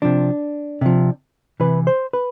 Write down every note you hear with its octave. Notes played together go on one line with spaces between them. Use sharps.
C3 F3 D4
C3 F3
C3 E3 B4
C5
B4